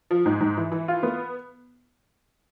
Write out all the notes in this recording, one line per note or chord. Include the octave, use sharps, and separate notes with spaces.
F3
G#2
G#2
E3
E3
F4
B3